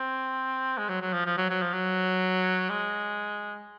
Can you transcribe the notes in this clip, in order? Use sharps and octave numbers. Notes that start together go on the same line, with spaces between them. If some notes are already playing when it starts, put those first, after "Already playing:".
Already playing: C4
G#3
F#3
F#3
F3
F3
F#3
F#3
F3
F#3
G#3